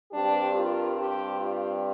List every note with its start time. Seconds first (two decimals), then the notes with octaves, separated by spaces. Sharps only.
0.11 G2 G3 C4 D4 G4
0.54 F4 A#4
0.97 D4 G4
1.41 F4